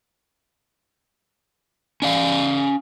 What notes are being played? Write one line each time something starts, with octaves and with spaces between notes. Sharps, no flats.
C#4 D5 F5